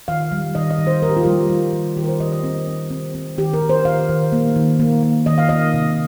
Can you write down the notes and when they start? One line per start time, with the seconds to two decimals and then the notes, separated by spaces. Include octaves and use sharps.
0.08 D#3 F5
0.32 G3
0.55 D#3 D#5
0.71 D#5
0.79 D#3
0.87 C5
1.03 D#3 A#4
1.09 G4
1.17 F4
1.23 G3 G4
1.50 G3
1.73 D#3
1.97 D#3 G4
2.04 A#4
2.08 C5
2.20 D#3 D#5
2.32 D#5
2.44 C4
2.67 C4
2.91 C4
3.15 C4
3.38 D#3 G4
3.54 A#4
3.62 D#3
3.69 C5
3.85 D#3 F5
4.09 D#3
4.32 A#3
4.56 D#3
4.80 A#3
5.03 A#3
5.26 D#3 D#5
5.38 F5
5.49 A#3 D#5
5.74 C3